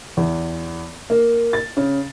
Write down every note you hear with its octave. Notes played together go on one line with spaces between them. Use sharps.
E2
A#3
A6
C#3